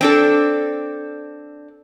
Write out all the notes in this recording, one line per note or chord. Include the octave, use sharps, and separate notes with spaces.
C4 D4 A4